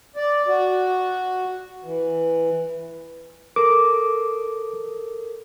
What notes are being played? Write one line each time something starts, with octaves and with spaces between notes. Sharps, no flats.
D5
F#4
E3
A4 A#4 D6